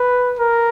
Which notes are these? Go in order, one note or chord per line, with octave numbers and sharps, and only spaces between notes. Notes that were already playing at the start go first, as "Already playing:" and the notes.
Already playing: B4
A#4